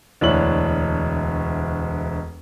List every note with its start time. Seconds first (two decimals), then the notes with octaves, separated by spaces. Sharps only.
0.21 E1 D2 D4 E4 C#5 F#7